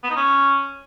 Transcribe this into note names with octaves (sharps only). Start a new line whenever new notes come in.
B3
D#4
C#4